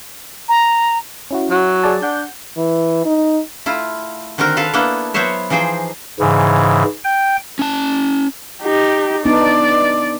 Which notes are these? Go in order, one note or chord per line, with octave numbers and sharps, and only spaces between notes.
A#5
C#4 E4 F#4
F#3
G#4 D5 A5
D4 F#5 G6
E3
D#4
A3 E4 F4
D3 D#3 C4 F#4 A#4
D3 A4 B4 F5
A#3 B3 D4 E4 A4
F#3 B3 E4 C5 C#5 E5
E3 F3 D#4 G#4 C5 G5
G#2 C#3 E3
G5
C#4 A5
D#4 G4
B3 D4 D#4 D5